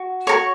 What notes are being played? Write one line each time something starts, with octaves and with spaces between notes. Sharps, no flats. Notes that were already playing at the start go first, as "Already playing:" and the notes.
Already playing: F#4
F#4 A#4 C#5 C#6